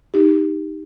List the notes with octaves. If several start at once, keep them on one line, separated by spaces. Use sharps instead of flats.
D#4 G4